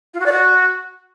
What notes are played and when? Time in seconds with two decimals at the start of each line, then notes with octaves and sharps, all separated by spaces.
0.14 F4
0.20 F#4
0.26 D5
0.32 F#4